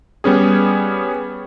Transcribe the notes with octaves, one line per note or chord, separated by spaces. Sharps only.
G3 B3 C#4 G#4